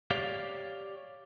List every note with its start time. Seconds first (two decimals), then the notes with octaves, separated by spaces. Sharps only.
0.11 G4 C#5 D5 F5